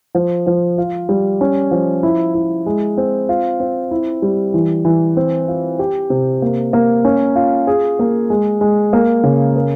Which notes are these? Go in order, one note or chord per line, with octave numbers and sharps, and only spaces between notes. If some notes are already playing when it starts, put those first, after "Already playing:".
F3
F3
F4
G3
C#4
F3
E4
E4
G#3
C4
F4
C4
E4
G3
E3
E3
C4
F4
G4
C3
A#3
A#3
C#4
F4
G#4
A#3
G#3
G#3
A#3
C#3
A#4